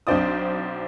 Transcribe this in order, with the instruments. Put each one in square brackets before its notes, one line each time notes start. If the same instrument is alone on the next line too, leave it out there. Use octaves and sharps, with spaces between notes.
[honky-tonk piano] B1 C4 D4 C5 D5 D#6